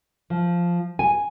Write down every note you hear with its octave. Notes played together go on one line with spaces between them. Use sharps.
F3
G#5